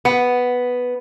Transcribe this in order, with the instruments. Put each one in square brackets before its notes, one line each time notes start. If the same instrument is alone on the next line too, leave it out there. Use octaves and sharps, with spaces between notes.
[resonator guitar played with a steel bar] B3